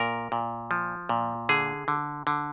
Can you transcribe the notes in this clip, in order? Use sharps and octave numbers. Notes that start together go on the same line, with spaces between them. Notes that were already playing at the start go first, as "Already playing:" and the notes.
Already playing: A#2 A#4
A#2
F3
A#2
D3 G#4
D3
D3